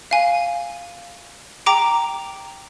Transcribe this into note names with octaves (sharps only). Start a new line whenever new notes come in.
F5 G#5
G5 A#5 D6 D7